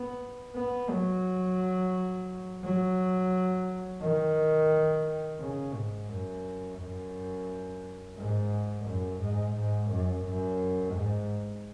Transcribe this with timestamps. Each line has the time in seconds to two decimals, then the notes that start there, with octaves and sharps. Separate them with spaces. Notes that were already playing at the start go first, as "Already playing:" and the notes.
Already playing: B3
0.56 B3
0.90 F#3
2.63 F#3
4.01 D#3
5.40 C#3
5.75 G#2
6.09 F#2
6.78 F#2
8.17 G#2
8.86 F#2
9.21 G#2
9.55 G#2
9.90 F#2
10.25 F#2
10.94 G#2